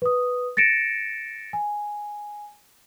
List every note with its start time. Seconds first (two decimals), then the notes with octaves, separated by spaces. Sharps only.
0.02 B4 D#6
0.57 A6 A#6 C#7 D7 E7
1.53 G#5